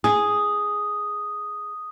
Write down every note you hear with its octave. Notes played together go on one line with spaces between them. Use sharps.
G#4 D#6